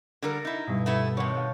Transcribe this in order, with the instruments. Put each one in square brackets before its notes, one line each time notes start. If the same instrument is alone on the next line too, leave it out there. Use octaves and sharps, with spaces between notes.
[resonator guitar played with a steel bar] D3 G3 A#4 [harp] A#5 A6 A#6
[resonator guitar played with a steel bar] D#4 E4
[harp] G2 B2
[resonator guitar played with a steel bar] A3 B3 E4
[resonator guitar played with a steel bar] C3 D#3 [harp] C#5 F#5 A5
[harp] F5 G5